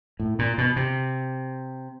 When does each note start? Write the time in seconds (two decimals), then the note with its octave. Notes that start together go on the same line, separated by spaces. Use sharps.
0.20 A2
0.39 A#2
0.58 B2
0.76 C3